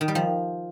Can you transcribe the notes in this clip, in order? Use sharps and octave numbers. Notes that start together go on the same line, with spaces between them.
D#3
G3
F3